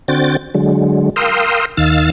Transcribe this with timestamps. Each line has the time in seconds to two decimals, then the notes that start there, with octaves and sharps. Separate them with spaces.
0.08 D3 C4 F#4 G5 A6
0.55 D3 F#3 G#3
1.16 A#4 F5 G5 C6 D#6 E6
1.77 D#2 D#3 F5 E6 A6